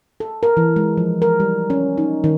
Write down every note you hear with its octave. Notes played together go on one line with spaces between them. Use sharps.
A4
A#4
E3
G#3
F3
A#4
G3
C#4
D#4
D#3